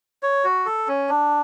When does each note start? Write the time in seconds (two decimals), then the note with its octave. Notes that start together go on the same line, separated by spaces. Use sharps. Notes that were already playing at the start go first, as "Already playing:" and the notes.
0.23 C#5
0.44 F#4
0.66 A4
0.88 C#4
1.09 D4